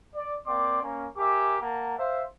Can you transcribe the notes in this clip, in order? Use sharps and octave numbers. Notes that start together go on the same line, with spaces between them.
D5
A#3 C4 D5 G5 C6 D6
A#3 C#4
G4 A#4 E5 G#5 D6
A#3 F#5 A5 A#5
C5 E5 F5